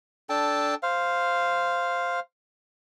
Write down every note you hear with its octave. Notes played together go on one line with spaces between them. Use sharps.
D4 A4 G5 A5
C5 F5